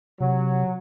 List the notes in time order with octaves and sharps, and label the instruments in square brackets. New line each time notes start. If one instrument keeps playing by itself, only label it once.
[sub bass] C3 [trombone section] F#3